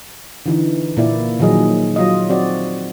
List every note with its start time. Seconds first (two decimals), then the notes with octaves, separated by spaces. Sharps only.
0.46 D3 E3 D#4
0.97 A#2 A#3 E4 D5
1.40 A#2 D#3 F3 F#3 G#4 D#5
1.96 F#3 F4 D#5
2.29 C4 F#4 D5